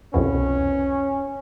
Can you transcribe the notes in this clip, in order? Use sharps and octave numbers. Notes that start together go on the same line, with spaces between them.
C2 F2 B2 C#4